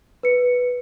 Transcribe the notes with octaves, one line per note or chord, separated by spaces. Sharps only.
B4 C#7